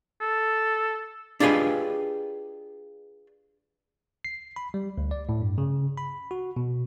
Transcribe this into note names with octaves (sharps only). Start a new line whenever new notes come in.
A4
D4 F4 G4 G#4 B4 D#5
C7
B5
G3
D2
D5
A2
G2
C#3
B5
F#4
B2